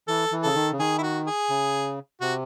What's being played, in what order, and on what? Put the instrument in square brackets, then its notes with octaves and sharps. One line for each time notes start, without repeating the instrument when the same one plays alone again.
[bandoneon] E3 [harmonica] A4
[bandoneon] E3
[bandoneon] C#3 [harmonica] A4
[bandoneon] D#3
C#3
[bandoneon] D#3 [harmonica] G#4
[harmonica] E4
F#4
G#4
[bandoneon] C#3
[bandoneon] C3 [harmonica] F#4